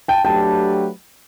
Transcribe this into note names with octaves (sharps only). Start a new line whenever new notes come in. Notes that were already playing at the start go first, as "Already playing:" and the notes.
G5 A5
F#3 A3 D4 G4 B4 G5 A5